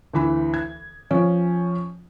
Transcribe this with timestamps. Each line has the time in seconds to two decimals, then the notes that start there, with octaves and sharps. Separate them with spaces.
0.13 D2 E3 B5
0.54 G#6
1.11 F3 C#4